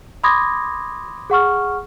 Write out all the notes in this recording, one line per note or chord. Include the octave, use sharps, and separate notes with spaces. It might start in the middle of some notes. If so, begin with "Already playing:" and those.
B5 C6 D6 D#6 G#6 A#6
G#4 F#5 C#6 F6